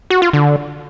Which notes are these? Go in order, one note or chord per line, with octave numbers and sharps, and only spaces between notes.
F#4
F4
D3